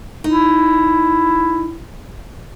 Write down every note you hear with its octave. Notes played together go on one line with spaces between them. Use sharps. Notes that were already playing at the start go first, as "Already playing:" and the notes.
D#4 E4